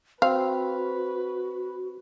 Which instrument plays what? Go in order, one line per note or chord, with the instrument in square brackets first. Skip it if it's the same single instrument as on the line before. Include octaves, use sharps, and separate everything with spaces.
[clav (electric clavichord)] C4 [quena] F#4 [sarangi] B4 [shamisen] F5